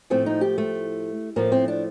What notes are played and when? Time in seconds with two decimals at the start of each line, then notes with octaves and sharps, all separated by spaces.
0.10 A2 F3 A3 C4
0.26 D#4
0.41 G4
0.58 A3
1.36 A2 F3 A3 A#3
1.52 C4
1.68 D4